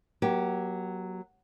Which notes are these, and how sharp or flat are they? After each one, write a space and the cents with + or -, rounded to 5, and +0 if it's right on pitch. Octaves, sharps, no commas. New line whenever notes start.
F#3 +0 A#3 +35 G4 -10